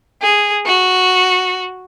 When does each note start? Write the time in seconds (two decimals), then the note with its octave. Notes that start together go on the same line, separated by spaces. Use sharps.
0.22 G#4
0.66 F#4